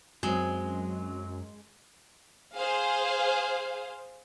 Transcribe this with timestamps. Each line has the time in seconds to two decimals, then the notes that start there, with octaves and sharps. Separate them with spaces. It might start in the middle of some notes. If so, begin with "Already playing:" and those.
0.23 F#2 F#3 G#3 C4
2.56 G#4 C5 F5